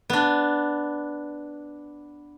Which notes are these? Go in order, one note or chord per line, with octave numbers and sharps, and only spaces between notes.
B3 D4